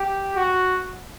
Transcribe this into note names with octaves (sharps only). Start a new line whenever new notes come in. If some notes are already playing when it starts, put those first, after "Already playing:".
Already playing: G4
F#4